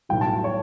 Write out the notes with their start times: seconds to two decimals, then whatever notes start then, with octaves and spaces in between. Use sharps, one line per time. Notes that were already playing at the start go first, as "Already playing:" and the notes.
0.09 B1 A2 E3 G5
0.21 A5
0.44 C#5